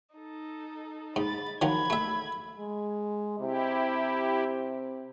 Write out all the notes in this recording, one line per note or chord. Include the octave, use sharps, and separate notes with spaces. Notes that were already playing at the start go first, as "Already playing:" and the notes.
D#4 A4
G#2 B5 A6
D#3 F3 F#3 B5 G#6
A3 E5
G#3
C3 E4 G4